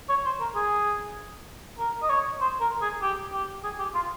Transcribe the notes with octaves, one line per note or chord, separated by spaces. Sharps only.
C#5
C5
A#4
G#4
A#4
D#5
C#5
C5
A#4
G#4
G4
G4
G#4
G4
F4